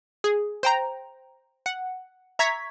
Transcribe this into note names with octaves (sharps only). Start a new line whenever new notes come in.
G#4
C5 G5 A#5
F#5
E5 A#5 C#6 G#6 B6